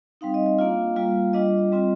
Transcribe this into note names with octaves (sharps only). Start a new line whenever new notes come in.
G3 C4 D#4 F5
D#5
D#5
A#3 D4 F4 F5
G3 A#3 F4
G3 D4 F4 D#5
G3 C4 F4